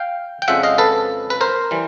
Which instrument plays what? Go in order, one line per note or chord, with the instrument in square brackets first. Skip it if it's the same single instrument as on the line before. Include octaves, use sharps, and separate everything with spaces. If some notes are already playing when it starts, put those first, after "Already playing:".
Already playing: [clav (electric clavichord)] F5 G5
G5
F2 C#3 F3 G#3 E5 F#5
D#5 F5
A4 B4
B4
A#4 C5
E3 G3